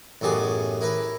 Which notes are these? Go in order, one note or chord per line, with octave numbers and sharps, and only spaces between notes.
A1 F#2 B3 G4 G#4
E4 A#4 B4